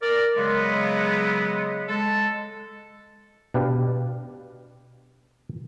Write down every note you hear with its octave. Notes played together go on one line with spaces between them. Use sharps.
A#4 D5
C#3 F#3 G#3 B3
G#3 A4
B2 D4 G4 B4 F5